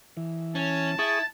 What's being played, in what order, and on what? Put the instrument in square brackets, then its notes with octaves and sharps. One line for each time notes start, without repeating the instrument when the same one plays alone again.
[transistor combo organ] E3
[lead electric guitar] C#4 [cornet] A5
[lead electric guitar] E4 [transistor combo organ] G#4 C#6 D#6 [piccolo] A6